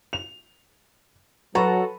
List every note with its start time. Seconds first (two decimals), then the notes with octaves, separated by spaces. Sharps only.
0.13 F7
1.55 F#3 F#4 A4 B4 A#5